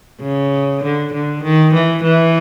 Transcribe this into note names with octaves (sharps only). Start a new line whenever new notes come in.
C#3
D3
D3
D#3
E3
E3